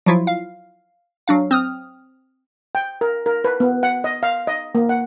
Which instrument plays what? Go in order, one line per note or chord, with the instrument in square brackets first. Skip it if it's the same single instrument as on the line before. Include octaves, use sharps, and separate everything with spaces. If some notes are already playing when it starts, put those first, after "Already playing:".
[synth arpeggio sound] F3 F#3 E4 F4
F5
F#3 D4 F5
C4 D#6 F6
[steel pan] G5
A#4
A#4
B4
B3
F#5
D#5
F5
D#5
A#3
F#5